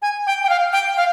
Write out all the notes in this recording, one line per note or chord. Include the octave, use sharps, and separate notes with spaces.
G#5
G5
G5
F5
G5
F5